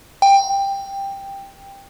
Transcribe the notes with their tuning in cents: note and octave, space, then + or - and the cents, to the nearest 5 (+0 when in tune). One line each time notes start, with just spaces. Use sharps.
G5 +10